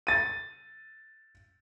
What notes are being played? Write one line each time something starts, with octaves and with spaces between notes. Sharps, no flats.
A6 D#7